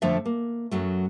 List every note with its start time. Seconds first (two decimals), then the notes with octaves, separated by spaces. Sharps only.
0.02 F2 D3 F3 A3 E5
0.26 A#3
0.71 F#2 F#3 A3